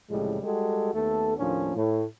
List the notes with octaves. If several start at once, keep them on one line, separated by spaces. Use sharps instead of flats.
C2 A2 C#3 F3 G3 G#3
G3 G#3 F#4 G4 A4
D#2 A3 B3 A4
D#2 A2 F3 A#3 C#4 D4
A2